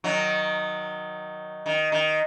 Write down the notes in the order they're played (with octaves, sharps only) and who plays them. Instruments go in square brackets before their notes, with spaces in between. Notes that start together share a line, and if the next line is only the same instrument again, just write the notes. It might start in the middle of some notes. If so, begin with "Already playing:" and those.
[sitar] D#3 F#3
D#3
D#3